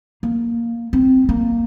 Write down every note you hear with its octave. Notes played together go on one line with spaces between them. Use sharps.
A#3
C4
A#3